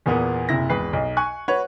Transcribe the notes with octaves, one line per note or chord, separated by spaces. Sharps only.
E2 A#2 A#3 B3
F#1 C3 E4 A#6
G#1 E2 B4 C7
B1 D#4
G#5 C#6 F#6
F#4 B4 C#5